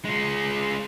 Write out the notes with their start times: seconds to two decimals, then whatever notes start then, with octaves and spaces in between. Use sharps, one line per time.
0.05 G#3 F4